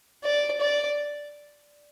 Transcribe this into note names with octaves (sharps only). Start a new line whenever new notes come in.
D5
D5